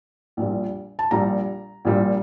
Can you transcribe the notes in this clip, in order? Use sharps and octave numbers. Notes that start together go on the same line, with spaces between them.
A#1 A#2 G3
A5
A#1 A#2 G3 A#5
A#1 A#2 G3